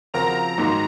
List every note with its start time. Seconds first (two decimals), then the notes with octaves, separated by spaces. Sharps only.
0.14 C#3 F3 C4 F#4 A#4 A#5
0.58 G#2 D#3 F#3 A#3